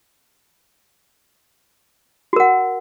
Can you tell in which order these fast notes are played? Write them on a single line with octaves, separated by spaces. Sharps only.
F#4 A#4 F#5